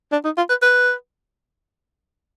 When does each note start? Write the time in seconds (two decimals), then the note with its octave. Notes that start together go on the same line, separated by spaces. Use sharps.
0.12 D4
0.24 D#4
0.37 F4
0.49 B4
0.62 B4